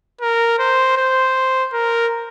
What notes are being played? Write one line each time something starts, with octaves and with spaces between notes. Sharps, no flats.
A#4
C5
C5
A#4